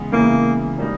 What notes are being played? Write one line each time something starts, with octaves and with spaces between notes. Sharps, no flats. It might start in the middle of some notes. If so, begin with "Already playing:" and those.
Already playing: C#3 E3 G#3 B3
C#3 E3 G#3 A#3 B3 E4
G3 A#3 D#4